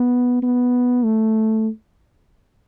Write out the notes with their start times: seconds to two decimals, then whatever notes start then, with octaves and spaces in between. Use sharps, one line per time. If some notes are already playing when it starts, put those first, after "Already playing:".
Already playing: B3
0.42 B3
1.04 A3